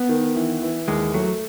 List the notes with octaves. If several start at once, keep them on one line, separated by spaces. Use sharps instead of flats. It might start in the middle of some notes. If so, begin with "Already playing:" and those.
Already playing: B3
D#3
E3
E3
D#2 G#3
F#3 A3